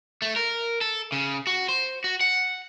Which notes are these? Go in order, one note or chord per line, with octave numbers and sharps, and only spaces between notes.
A3
A#4
A4
C#3
F#4
C5
F#4
F#5